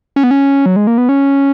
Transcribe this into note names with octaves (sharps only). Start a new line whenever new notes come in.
C#4
B3
C#4
F#3
G#3
A#3
B3
C#4